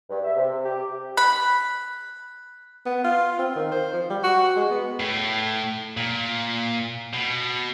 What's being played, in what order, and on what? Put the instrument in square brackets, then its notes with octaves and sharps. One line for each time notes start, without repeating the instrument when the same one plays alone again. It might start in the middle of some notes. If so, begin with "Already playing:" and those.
[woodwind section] G2
E5
C3
G4
[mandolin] B5 [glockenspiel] F#6
[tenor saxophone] B3
F4
C4
D#3
C5
F3
G3
F#4
G#3
B3
[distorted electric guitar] A2
A#2
B2